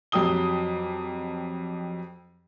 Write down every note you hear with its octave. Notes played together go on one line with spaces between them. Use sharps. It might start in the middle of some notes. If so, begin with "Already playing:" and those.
F2 F#3 G4 D#6 G7